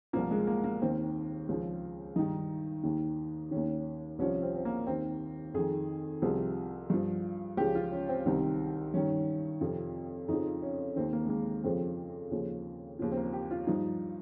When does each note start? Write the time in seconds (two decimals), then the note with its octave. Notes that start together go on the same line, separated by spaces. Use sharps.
0.13 C2 A#2 F3 A#3
0.31 G#3
0.47 A#3
0.64 A#3
0.82 D#2 D#3 C4
1.49 C#2 C#3 F3
2.16 G2 D#3 D#4
2.84 D#2 D#3
3.51 D#2 D#3 C#4
4.19 C2 C3 F3 C#4
4.42 C4
4.55 C4
4.65 A#3
4.87 D#2 D#3 C4
5.54 F2 D#3 G#4
6.22 C2 C3 F3 G#4
6.90 G2 F3
7.57 C#2 C#3 F3 G4
7.75 F4
7.92 C#4
8.09 C4
8.26 C2 C3 D#3
8.94 G2 D#3 C#4
9.61 F2 C3 F3
10.28 F2 C#3 F3 D#4
10.62 C#4
10.96 D#2 D#3 C4
11.13 A#3
11.26 G#3
11.30 A#3
11.64 F2 C#3 F3 C4
12.32 D#2 C#3 F3
12.99 D#2 C#3 F3
13.12 C4
13.17 A#3
13.33 G4
13.51 F4
13.67 G2 F3 D#4